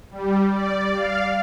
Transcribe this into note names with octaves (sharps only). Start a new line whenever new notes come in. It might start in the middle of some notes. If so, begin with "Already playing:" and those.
G3
D5
F5